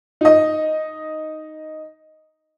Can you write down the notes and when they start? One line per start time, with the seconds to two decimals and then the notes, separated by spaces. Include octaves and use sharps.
0.21 D#4 D#5